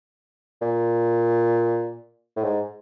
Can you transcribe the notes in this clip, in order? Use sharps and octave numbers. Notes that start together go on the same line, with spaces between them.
A#2
A2
G#2